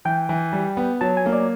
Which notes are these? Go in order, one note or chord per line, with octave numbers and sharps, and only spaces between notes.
E3 G5
E3
G3
B3
F#3 A5
G#5
A#3
D5